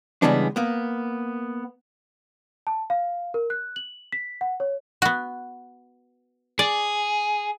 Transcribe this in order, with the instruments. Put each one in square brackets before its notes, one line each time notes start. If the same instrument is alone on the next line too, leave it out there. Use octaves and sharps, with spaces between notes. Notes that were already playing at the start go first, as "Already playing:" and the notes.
[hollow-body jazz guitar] C#3 E3 G3 G#3 B3 D4
A#3 B3
[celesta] A5
F5
A#4
F#6
F#7
B6
F#5
C#5
[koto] B3 F#4
[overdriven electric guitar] G#4 [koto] D5